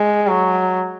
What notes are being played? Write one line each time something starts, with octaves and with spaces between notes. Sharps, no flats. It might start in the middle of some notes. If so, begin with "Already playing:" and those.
Already playing: G#3
F#3